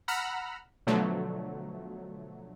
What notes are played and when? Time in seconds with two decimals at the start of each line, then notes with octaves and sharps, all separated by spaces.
0.08 F#5 A#5 B5 E6 F6
0.87 B2 D3 F3 F#3 A3